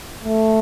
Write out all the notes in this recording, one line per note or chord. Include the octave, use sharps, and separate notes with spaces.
A3